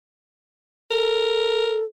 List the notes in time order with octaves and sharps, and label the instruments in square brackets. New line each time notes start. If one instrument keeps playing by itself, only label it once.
[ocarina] A4 [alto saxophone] A#4